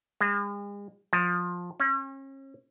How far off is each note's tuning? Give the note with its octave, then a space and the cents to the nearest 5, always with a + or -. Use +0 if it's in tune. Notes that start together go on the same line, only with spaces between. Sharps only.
G#3 -40
F3 +20
C#4 -40